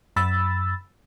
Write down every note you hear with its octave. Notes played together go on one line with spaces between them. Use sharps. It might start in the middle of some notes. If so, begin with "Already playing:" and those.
F#2 B5 E6 A6